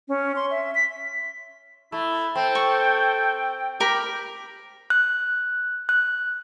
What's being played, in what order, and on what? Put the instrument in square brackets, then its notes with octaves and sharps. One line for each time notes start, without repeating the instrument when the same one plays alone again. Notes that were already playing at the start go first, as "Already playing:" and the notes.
[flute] C#4
C6
E5
B6
[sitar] A3 [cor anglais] E4
[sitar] C4 [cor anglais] A4 [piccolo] G5
[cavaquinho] C#6
[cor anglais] G4 [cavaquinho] A#4 B5
[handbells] F#6
F#6